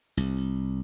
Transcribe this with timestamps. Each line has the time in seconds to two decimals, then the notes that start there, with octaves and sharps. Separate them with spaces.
0.17 C2